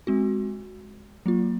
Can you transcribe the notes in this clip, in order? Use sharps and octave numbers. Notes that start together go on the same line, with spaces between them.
G#3 C4 F#4
F#3 A#3 F4